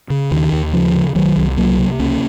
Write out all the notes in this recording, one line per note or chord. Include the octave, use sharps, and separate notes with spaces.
C#3
D#2 D#3
D#2
C#3 F3
C#3
C2 D#3 F#3
C2
C3 F#3 A#3
C3
C#2 A#3 C#4